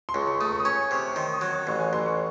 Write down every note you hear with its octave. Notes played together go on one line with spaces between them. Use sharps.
C6
C#2 C#6
C#6
A3 D#6
C#6
D#6
C#4 C#6
C3
C#6
D#3 C6
D#6
F#3
C#6
C#6
A1 C6
G#5
A1 C6
C#6